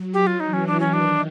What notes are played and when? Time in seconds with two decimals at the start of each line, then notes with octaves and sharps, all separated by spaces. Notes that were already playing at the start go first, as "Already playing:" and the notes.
Already playing: F#3
0.14 G4
0.27 F4
0.40 E3 D#4
0.53 C#4
0.67 D4
0.80 C#4
0.93 D#3 D4